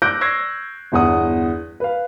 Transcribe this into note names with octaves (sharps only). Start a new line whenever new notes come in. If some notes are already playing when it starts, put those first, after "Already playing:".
D6 E6 F#6 G6 A#6 D7
C#6 E6 G#6 A#6 C7
G1 E2 F#5 D#6
B4 F5